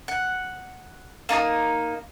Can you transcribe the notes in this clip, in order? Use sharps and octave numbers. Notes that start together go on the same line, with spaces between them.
F#5
A#3 D#4 A5 D#6